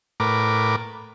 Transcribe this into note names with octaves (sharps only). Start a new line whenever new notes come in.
A2 A#4 B4 D6